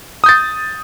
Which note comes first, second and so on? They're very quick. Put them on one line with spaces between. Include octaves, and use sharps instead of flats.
D#6 G6 A6